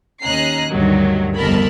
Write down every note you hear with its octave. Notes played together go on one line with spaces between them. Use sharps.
D#2 C#4 D#5 A#5 F#6 C7
D2 G2 D#3 F#3
G1 C2 F2 A#4 A5 B5